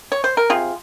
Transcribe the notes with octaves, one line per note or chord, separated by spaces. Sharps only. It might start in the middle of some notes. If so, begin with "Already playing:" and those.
C#5
C5
A#4
C3 F4 G#4